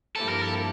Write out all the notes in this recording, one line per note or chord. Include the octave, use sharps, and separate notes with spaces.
G2 F3 A#3 E4 G4 A4
A#4
A4